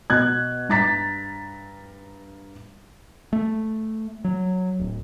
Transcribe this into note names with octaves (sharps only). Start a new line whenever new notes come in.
B2 F#6 G#6
G2 A#5 A6 B6
A3
F#3
D1